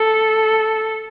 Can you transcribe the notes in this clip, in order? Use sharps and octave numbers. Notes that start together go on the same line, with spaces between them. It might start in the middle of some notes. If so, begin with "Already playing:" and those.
Already playing: A4